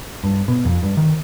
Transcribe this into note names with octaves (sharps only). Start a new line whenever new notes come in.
G2
B2
F2
G2
D#3